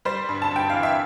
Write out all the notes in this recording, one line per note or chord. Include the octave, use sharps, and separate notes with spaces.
G3 C5
G2
A5
G2 G5
E3 F5
E5